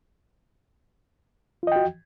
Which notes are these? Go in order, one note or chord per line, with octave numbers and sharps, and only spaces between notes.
F4 F#4 D#5 G5